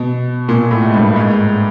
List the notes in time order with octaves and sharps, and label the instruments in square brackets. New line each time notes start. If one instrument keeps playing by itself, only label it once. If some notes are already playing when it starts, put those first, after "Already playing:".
Already playing: [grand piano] B2
A#2
A2
G#2
G2
G#2